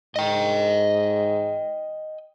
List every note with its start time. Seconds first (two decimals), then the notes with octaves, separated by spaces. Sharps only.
0.16 G#2 D#5 G5